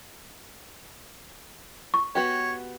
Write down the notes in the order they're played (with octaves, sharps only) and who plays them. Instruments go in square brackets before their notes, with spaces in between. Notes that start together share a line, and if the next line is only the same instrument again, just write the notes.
[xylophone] C#6
[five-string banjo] B3 F#4 G4 [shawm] C#5